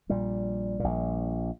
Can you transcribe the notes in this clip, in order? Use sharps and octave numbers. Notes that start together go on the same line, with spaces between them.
A#1 A#2 G3
A#1 A#2